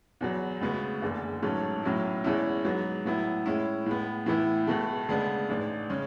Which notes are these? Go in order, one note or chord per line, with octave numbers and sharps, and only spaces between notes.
E2 B2 F#3
D2 C#3 G#3 B3 F#4
F#1 E2 D3
A1 G#2 F#3 A3 C#4
B1 A2 F#3 C#4 E4
E2 B2 G#3 C#4 E4
G#2 F#3 B3
A2 F#3 B3 E4
A2 G#3 C#4 E4
A2 G#3 B3
A2 E3 B3 E4
C#2 B2 A3
D2 C#3 G#3 B3 D4
A1 G#2 G#3 D4
C#3 G#3 C#4